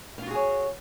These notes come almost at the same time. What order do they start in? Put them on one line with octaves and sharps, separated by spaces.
F5 F4 F#4 G#4 C#5